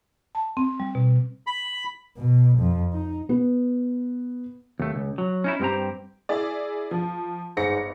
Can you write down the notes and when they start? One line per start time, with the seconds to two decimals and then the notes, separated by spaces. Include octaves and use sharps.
0.35 A5
0.57 C4
0.80 G3
0.95 B2
1.47 B5
2.17 B2
2.58 F2
2.93 D#4
3.29 B3
4.80 D#2 A3
4.95 C#2
5.18 F#3
5.44 C#4 D#4 E4
5.60 G2 G3 C4 G4 C5 A#5
6.29 E4 G#4 D5
6.91 F3
7.57 G1 G#2 A#6 C#7